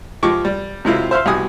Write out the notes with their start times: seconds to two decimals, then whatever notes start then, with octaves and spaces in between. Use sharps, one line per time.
0.23 F3 G#3 G4 D#5 C#6 D6
0.45 G3
0.85 C3 F#3 G#3 C4 E4 F4
1.11 C5 E5 F5 C6
1.26 C2 B2 G4 G#5 D#6